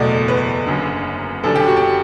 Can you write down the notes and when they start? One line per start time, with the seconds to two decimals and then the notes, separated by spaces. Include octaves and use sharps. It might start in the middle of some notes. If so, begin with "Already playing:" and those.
Already playing: F#1 E2 B2 A3 D5
0.28 B4
0.66 F#1 F#2 D3
1.43 F#2 D3 G3 D4 A4
1.55 G4
1.66 F#4
1.77 G4